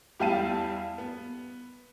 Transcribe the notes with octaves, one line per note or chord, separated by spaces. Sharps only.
E2 G3 E4 F5 A5 D#7
B3